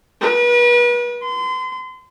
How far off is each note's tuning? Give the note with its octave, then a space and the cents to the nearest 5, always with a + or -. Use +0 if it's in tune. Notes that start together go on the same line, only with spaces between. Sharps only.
B4 -35
C6 -35